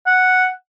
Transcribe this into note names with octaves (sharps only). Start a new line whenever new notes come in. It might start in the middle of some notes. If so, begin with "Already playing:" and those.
F#5